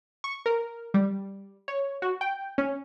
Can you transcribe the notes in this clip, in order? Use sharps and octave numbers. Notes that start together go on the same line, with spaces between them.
C#6
A#4
G3
C#5
F#4
G5
C#4